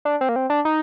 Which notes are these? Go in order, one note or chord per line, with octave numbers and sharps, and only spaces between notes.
D4
C4
A#3
C4
D4
D#4